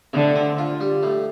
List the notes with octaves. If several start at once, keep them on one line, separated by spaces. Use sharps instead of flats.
A2 D3
C4
F4
G3
A2